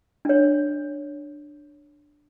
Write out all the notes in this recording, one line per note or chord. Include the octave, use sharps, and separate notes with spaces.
D4 C#5